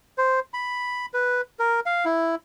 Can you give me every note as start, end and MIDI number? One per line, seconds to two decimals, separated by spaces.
0.18 0.40 72
0.54 1.06 83
1.14 1.41 71
1.59 1.80 70
1.86 2.05 77
2.05 2.35 64